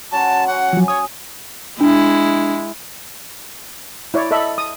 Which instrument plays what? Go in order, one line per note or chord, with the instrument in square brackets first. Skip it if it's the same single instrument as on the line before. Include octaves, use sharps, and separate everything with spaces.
[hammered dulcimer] F#3 C#4 C5 [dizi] A5
[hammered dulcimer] C#4 [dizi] F#5
[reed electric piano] F3 F#3 [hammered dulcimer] G#5
[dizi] C#5 [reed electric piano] D#6
[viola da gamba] G#3 E4 [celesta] D4
[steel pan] E4 C#5 D5
A4 D#5 E5 B5
D#6